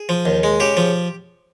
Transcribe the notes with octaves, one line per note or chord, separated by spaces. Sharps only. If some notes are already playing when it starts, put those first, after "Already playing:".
Already playing: G#4
F3
D#2
G#3
C#3 G4
F3